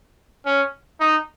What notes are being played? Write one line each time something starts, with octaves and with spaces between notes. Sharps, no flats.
C#4
D#4